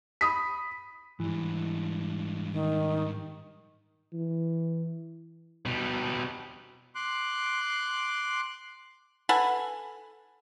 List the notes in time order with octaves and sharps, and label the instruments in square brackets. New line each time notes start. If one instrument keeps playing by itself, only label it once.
[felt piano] B5 D#6 B6
[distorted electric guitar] G#2 G3 [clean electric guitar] E3
[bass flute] D#3
[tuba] E3
[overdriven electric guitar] B2 G3
[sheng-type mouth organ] C6 D6 F#6
[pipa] A4 B4 F#5 G#5